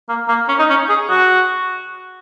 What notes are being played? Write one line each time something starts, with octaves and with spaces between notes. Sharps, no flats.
A#3
A#3
C#4
D#4
C#4
G#4
F#4